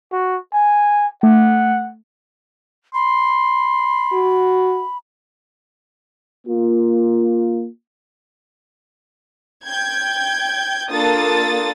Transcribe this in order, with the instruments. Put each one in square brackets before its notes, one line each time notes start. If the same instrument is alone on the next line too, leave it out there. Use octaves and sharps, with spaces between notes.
[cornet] F#4
G#5
[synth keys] A3 [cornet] F#5
[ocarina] B5 [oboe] C6
[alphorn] F#4
[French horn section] A#3 F4
[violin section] G5 G6 G#6
A#3 D4 F4 A4 D#6 A6